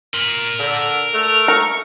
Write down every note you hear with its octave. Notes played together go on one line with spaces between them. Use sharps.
A#4 C6
D3
A3 F6
A#4 C#6